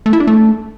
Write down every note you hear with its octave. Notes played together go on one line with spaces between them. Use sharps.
A3
E4
D4
A3